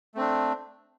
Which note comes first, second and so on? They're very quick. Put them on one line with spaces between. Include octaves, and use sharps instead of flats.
A3 C4 D4